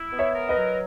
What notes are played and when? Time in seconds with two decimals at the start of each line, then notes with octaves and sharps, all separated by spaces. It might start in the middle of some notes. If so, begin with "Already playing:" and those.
Already playing: E4
0.11 B3
0.19 C#5 E5
0.34 A#4
0.49 B4 D#5
0.57 F#3